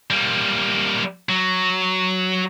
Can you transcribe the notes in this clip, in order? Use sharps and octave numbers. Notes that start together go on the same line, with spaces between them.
G3 A#3
F#3